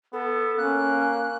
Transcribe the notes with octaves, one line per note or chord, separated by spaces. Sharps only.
B3 A4
A#3 C#4 F#6